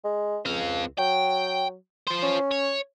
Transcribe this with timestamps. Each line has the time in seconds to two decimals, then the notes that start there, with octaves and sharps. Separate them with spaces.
0.04 G#3
0.46 C#2 C4 F5
0.99 F#3 G5
2.07 F4 C5
2.23 C#4
2.51 C#5